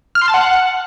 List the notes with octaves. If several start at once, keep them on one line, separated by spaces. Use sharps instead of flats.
F6
C6
A5
F#5